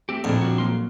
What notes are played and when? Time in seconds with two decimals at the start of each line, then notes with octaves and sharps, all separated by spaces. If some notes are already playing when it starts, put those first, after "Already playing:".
0.09 A3 C4 G4
0.24 A#1 F2 A2 D3 D4
0.41 D4 F#4
0.58 F#3 A#3 C6